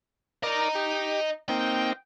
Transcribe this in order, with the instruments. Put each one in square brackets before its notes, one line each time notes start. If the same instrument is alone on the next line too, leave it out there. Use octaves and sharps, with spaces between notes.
[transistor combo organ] A#4 D5 [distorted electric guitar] D#5 A#5
[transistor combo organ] G4
[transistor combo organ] A#3 C4 D#4 [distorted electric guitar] G5